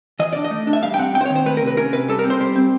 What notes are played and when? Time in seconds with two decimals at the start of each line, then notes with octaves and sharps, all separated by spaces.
0.19 E3 D#5
0.33 D4 D5
0.44 D#5
0.51 A3
0.67 D4
0.73 E5
0.83 G3 F5
0.94 G5
0.99 C4 F#5
1.14 C4 G5
1.21 C5
1.25 C#5
1.30 D#3
1.36 C5
1.46 A3 B4
1.57 A#4
1.62 C3
1.67 B4
1.77 C#4 A#4
1.93 C3 B4
2.08 G3 A4
2.19 A#4
2.24 C4
2.30 C5
2.40 G3 C5
2.56 C4